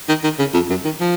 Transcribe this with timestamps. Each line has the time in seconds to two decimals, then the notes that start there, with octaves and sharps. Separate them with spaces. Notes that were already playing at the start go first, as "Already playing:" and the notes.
0.09 D#3
0.24 D#3
0.39 C#3
0.54 F2
0.70 F#2
0.85 D#3
1.00 F3